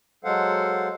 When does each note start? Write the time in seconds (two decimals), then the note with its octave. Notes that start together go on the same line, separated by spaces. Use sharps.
0.24 F#3 G#3 A4 C5 F5 F#5